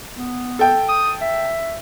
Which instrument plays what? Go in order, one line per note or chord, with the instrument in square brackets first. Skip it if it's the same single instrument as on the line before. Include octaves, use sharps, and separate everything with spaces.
[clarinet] B3
[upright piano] A4 G5
[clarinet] D#6
E5